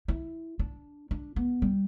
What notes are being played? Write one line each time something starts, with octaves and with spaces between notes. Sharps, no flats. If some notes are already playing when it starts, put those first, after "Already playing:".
E4
D4
D4
B3
G3